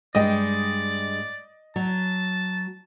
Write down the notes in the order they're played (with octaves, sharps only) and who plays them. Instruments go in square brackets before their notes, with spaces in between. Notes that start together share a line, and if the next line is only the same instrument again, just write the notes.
[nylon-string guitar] G2 G#3 G5 [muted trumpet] D5 [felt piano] D#5
[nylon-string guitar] F#3 [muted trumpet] A5